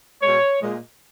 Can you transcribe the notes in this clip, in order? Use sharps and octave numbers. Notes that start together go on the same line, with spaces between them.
B2 G#3 C#5
A#2 G#3